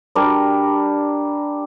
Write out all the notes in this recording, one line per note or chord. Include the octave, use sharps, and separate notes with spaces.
G3 D4 A#4